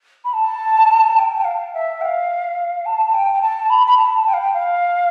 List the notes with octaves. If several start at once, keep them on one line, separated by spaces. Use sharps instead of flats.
B5
A5
G5
G5
F5
E5
G5
F5
A5
G5
G5
A5
B5
B5
A5
G5
F5
G5
F5